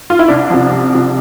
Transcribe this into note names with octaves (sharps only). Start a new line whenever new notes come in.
F4
E4
C2 D4
C3 F3
C2
C3 F3